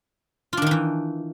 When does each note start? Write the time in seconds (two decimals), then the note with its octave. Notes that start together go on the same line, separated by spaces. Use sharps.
0.53 F4
0.57 D4
0.62 D#3
0.67 D#4
0.71 E3